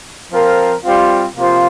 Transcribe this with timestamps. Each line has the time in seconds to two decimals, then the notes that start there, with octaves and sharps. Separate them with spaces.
0.32 F3 C4 F4 A#4
0.84 G3 C4 F4
1.36 C3 F3 A#3 F4 C5